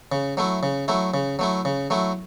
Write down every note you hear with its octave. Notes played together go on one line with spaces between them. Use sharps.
C#3
F#3 A3 E4
C#3
F#3 A3 E4
C#3
F#3 A3 E4
C#3
F#3 A3 E4